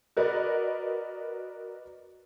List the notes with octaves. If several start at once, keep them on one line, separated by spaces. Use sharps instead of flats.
F#4 A#4 B4 D5 D#5